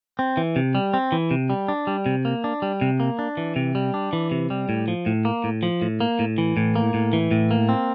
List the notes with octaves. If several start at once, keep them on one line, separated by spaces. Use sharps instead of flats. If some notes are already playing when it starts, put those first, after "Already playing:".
C4
E3
C3
G3
C4
E3
C3
G3
D4
G3
C3
A#3
D4
G3
C3
A#3
D4
E3
C3
G3
D4
E3
C3
G3
A2
F3
A2
A#3
A2
F3
A2
A#3
A2
E3
A2
A#3
A2
E3
A2
A#3
C4